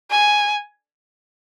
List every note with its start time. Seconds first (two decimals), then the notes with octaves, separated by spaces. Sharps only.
0.11 G#5